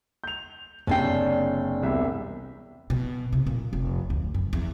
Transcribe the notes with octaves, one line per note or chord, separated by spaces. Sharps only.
G6 F7
F#1 C3 C#4 D4 G5 C7
E1 C2 E5
B2
C3
A#2
F1
D2
F#2
E2